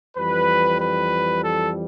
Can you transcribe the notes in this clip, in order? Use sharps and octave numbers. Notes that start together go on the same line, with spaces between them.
F2 E3 G3 B4
B4
A4